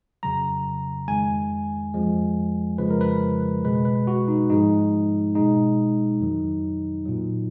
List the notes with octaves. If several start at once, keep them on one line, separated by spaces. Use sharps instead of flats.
F2 C#3 F#3 A#5
F2 D#3 G#3 G#5
F2 F3 G#3
F2 C#3 F3 G#3 B4
A#4
B4
B2 G#3 B4
B4
F#4
D#4
G#2 F3 G#3 D#4
B2 G#3 D#4
F2 D#3 F#3
A#2 F#3